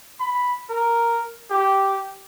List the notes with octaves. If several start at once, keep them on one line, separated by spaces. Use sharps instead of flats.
B5
A#4
G4